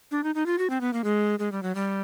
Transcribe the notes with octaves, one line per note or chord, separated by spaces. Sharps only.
D4
D#4
D#4
F4
F#4
C4
B3
A#3
G#3
G#3
G3
F#3
G3